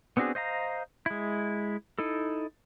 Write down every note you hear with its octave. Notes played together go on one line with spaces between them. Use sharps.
B3 C4 D4 F#4 G#4
C5 D#5 F5 A#5
G#3 E4
D#4 E4 A4